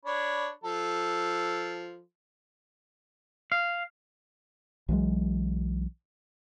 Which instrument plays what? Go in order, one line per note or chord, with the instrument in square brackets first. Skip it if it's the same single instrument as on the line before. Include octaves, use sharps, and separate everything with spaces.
[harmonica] D4 C#5 B5
F3 A4
[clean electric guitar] F5
[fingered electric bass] B1 E3 F#3 G#3